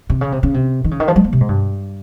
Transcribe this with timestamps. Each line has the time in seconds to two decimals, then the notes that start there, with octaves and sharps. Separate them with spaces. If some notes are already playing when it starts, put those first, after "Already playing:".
0.10 C3
0.21 C#3
0.32 C3
0.43 C#3
0.54 C3
0.84 D#3
0.91 C#3
1.00 D#3
1.08 F3
1.16 G3
1.24 A#3
1.33 C3
1.41 G#2
1.49 G2